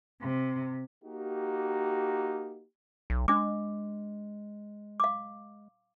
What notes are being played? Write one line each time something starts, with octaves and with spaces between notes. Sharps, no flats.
C3
A#3 D#4 F#4 G4
B1
G#3 D4 D6
F5 D6